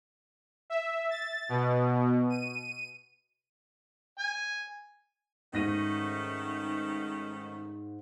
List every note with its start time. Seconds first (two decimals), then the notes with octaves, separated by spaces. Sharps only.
0.70 E5
1.10 A6
1.49 B2
2.30 D#7
4.19 G#5
5.53 G#2 D#3 A3 C#4 A#6 D#7